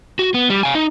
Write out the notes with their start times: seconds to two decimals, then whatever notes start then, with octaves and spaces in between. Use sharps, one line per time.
0.19 F#4
0.34 B3
0.50 G3
0.63 F5 G#5
0.75 D#4